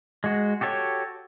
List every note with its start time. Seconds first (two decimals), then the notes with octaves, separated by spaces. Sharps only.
0.24 G#3 F#4
0.61 F#4 G4 A4 C#5